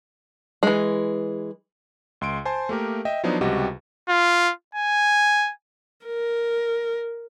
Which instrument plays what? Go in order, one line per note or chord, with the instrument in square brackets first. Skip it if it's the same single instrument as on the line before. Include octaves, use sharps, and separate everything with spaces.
[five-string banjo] E3 G#3
[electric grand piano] C#2 C6 D7
C5 G#5 A5 C6
A3 A#3 G4 A#4
D#5 E5 G5
F3 F#3 B3 D4 D#4
C#2 C3 G3 F#4 G4 D#5
[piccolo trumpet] F4
G#5
[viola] A#4